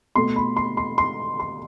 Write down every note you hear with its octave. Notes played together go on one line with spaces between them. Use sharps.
B2 A3 C6
B5
C6
C6
C6
C6